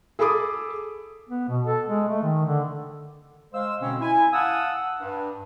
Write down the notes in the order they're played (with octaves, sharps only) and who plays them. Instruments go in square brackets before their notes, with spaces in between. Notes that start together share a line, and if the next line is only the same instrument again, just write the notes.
[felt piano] G#4 A4 B5 D6 D#6
[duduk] B3
B2
A4
G#3
A3
D#3
D3
[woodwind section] G#3 C5 F5 E6
B2 D3 C4 C#4
E4 G#5
F5 F#5 A5 D#6 E6
G2